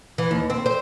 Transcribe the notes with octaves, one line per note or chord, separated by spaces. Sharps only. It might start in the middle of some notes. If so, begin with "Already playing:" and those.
E3
D#2
C4
C5